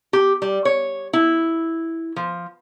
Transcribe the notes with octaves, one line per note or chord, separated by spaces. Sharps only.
G4
G3
C#5
E4
F3